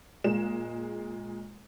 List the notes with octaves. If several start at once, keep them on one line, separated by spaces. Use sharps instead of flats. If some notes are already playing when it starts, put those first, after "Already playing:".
A#2 G#3 E7